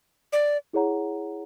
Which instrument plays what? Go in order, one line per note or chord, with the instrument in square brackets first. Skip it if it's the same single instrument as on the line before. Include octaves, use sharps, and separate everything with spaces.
[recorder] D5
[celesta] E4 G#4 C#5 F#5 A#5